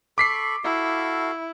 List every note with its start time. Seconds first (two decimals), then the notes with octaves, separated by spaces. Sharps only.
0.18 A4 B5 C#6 D6 B6 C7
0.64 E4 F#4 A4 F5